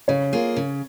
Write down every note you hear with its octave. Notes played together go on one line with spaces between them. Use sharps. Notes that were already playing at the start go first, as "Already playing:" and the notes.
C#3 C#5
A#3 F4 G#4
C#3